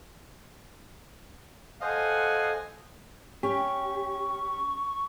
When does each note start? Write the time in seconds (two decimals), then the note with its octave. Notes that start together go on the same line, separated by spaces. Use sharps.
1.81 A4 C5 D#5 F5 F#5 G#5
3.43 C#4 G4 C#6